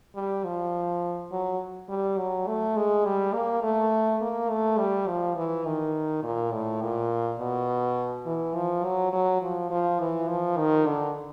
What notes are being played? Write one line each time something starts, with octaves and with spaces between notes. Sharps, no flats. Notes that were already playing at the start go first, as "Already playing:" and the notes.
G3
F3
F#3
G3
F#3
A3
G#3
G3
A#3
A3
A#3
A3
G3
F3
E3
D#3
A#2
A2
A#2
B2
E3
F3
F#3
F#3
F3
F3
E3
F3
D#3
D3